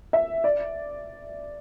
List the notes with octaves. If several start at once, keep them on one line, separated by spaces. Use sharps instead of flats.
E5
D5